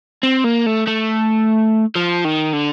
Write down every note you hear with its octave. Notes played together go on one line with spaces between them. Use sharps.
C4
A#3
A3
A3
F3
D#3
D3